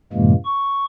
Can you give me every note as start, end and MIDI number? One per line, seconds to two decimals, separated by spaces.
0.13 0.33 42
0.13 0.33 45
0.13 0.33 48
0.13 0.33 52
0.13 0.33 56
0.13 0.33 58
0.45 0.85 85